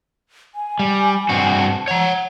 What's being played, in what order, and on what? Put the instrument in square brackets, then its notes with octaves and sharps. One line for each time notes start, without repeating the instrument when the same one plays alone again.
[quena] G#5
[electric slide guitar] G3
G2 C4 F#4
[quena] A5
[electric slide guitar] C#5 A#5 [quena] F#5